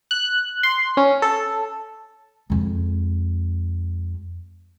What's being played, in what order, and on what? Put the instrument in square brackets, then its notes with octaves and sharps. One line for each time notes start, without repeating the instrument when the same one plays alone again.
[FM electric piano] F#6
C6
C#4
A4
[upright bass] F2 G#3